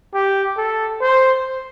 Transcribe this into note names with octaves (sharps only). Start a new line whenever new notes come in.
G4
A4
C5